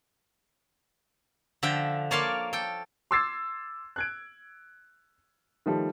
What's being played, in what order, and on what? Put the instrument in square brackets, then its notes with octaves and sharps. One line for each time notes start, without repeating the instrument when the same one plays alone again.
[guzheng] D3 F3 E5 G5
A#3 C#5 D5 F5 A5 C6
A4 G5
[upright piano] C6 D6 E6 G#6 A6 C7
F#6 G#6 D7
D#3 F3 G3 A3